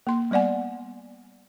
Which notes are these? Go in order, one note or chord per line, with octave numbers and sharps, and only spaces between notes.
A#3 C6
G3 B3 D5 F#5 G#5